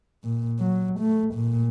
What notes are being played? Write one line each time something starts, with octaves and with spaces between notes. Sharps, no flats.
A#2
F#3
A3
A#2